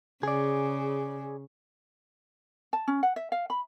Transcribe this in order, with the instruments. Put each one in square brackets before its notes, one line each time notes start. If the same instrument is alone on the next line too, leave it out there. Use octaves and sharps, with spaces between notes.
[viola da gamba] C#3 [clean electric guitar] G#4 D5
[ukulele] A5
C#4
F#5
E5
F5
B5